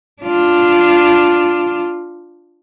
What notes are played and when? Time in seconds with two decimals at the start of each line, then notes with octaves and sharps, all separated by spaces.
0.22 D4 F4